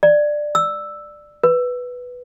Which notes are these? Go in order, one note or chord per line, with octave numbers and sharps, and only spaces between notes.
D5
E6
B4